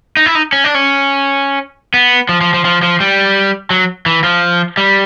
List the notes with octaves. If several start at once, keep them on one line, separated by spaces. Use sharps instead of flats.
D#4
E4
D#4
C#4
D4
C#4
B3
F3
F3
F3
F3
F3
G3
F#3
E3
F3
G3